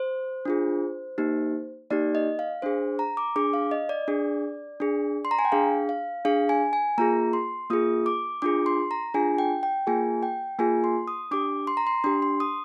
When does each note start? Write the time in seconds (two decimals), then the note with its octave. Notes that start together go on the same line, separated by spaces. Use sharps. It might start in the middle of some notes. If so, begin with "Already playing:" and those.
Already playing: C5
0.45 D4 F4 G#4
1.18 A#3 D#4 G4
1.90 A#3 D#4 G4 D5
2.15 D#5
2.39 F5
2.62 D4 G#4 C5
2.99 A#5
3.17 D6
3.36 D4 G#4 D6
3.54 F5
3.71 D#5
3.89 D5
4.08 D4 G#4
4.80 D4 G#4
5.25 C6
5.31 A#5
5.39 G#5
5.45 G5
5.52 D4 G#4 F5
5.89 F5
6.25 D4 G#4 F5
6.49 G#5
6.73 G#5
6.98 A#3 F4 G#4 A#5
7.33 C6
7.70 A#3 F4 G#4 D#6
8.06 D6
8.42 D4 F4 G#4 D6
8.66 C6
8.91 A#5
9.14 D4 F4 G#4 G#5
9.38 G5
9.63 G5
9.87 A#3 F4 G#4 G#5
10.23 G5
10.59 A#3 F4 G#4 G#5
10.84 C6
11.07 D#6
11.31 D4 G4 D6
11.67 C6
11.77 A#5
11.87 C6
12.04 D4 G4 C6
12.22 C6
12.40 D#6